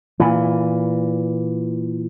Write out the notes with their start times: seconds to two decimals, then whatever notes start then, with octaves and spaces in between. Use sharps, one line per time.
0.20 A#2 E3